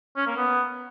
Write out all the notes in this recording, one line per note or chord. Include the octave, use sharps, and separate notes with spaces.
C#4
A#3
B3